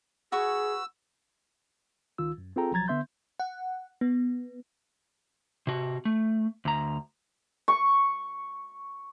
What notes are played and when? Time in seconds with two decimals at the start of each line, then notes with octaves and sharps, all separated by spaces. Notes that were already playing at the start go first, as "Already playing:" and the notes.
0.32 F#4 G#4 B4 C#6 E6
2.18 C#2 D#3 F4 E6
2.38 F#2
2.56 C4 F4 G#4 A4 G5 A#5
2.71 C2 F3 F#3 A#5 G#6 A6
2.88 D3 B3 E5 C6 G6
3.40 F#5
4.01 B3
5.67 C3 F#4
6.05 A3
6.65 D2 A#5
7.68 C#6